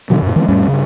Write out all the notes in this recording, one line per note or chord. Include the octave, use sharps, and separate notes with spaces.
B2 D3 D#3 F#3
F#2 A#2
D#3 E3 G#3 C4
F2 A2 G3 C#4
G2 C#3